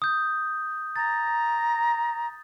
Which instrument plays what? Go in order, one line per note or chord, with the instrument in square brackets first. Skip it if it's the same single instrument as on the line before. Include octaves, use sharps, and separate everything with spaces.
[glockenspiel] D#6 G6
[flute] A#5 [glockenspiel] A6